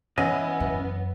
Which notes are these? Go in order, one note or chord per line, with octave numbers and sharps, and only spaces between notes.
E3 B3 C#4 E4 D#5
F#2